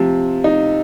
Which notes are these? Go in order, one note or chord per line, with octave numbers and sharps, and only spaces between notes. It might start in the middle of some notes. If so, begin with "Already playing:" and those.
Already playing: C3 F3
D#4